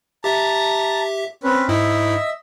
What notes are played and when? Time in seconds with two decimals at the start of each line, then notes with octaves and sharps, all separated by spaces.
0.24 G4 E5 A5 A#5
1.44 C4 C#4 B4
1.69 G#2 E4 D#5 E5 E6